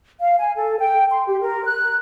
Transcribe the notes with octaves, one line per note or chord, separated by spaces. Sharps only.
F5
G#5
A4
G5
C6
G4
A#4
F#6